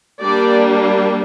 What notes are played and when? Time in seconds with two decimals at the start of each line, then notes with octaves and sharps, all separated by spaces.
0.21 G3 A#3 D4 D5